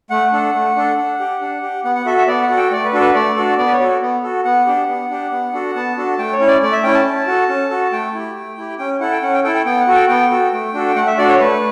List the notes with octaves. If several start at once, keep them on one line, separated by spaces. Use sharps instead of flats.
A3 F#5
D4 A4
A3
D4 A4
D4
G4
D4
G4
B3 F#5
F#5
F#4 A4 E5
E5
B3 D5
F#5
F#4 A4
G5
A3 D5
B4
D4 F#4 A4
B4
A3 D5
D4 F#4 A4
B3 D5
B4
C#5
F#4 A4
B3
F#4 A4
B3 F#5
D4 G4
B3
D4 G4
B3
D4 F#4 A4
B3 A5
D4 F#4 A4
A3 G5
C#5
C#4 E4
D5
A3 D5
E5
C#4 E4 G5
A5
C#4
F#4 A4
C#4
F#4 A4
A3 G5
E4 G4
A3
E4 G4
C#4 G5
E4 A4 F#5
G5
C#4 F#5
G5
E4 A4 G5
G5
B3 G5
F#5
F#4 A4
G5
B3 G5
F#4 A4
A3
D4 F#4 A4
A3 F#5
E5
D4 F#4 A4 D5
C#5
A3 B4